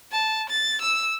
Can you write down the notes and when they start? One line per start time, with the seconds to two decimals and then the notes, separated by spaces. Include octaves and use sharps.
0.12 A5
0.50 A6
0.81 E6